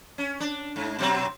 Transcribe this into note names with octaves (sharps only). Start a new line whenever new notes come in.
C#4
D4
G#2
B2 F#3 C4